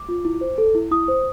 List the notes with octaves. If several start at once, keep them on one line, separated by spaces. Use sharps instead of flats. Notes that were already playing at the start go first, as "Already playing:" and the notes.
Already playing: D6
F4
E4
C5
A4
E4
E4 D#6
C5